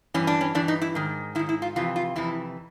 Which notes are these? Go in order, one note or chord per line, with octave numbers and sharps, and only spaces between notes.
G2 E3 C#4
D4
C#4
G2 E3 D4
D#4
E4
G#2 D#3
G#2 D#3 E4
E4
F4
F2 C3 E3 F4
F4
F2 C3 E3 E4